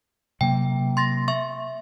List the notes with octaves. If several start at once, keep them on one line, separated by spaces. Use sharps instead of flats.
C3 F#3 A#3 G5
C6 A6 A#6
E5 C#6